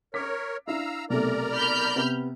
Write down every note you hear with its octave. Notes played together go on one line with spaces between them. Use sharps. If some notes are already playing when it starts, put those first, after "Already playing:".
A#4 C#5 D6 B6
D4 E4 F5 A#5 E6
B1 C3 A3 A#4 D5 A#5
B5 F6 G6
C3 B3